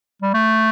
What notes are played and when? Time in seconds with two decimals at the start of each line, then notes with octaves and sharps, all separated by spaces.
0.22 G3
0.33 A3